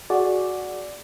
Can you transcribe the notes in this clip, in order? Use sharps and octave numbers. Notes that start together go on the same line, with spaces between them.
F#4 G#4 D5